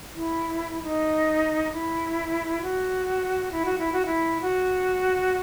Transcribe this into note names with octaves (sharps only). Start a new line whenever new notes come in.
E4
D#4
E4
F#4
E4
F#4
E4
F#4
E4
F#4